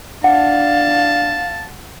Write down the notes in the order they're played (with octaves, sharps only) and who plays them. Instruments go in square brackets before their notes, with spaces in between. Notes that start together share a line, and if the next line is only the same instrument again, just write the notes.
[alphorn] D4 [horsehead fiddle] F5 [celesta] F#5 [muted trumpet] A5